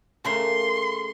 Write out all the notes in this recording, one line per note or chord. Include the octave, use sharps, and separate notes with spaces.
C#3 A3 A#3 C6